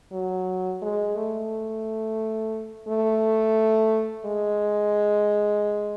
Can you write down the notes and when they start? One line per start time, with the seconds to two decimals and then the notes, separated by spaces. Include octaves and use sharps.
0.12 F#3
0.82 G#3
1.16 A3
2.88 A3
4.26 G#3